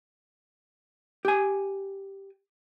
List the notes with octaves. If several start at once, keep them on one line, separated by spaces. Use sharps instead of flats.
G4 G#5